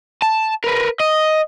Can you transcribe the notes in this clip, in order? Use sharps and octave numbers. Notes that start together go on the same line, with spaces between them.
A5
A#4 B4
D#5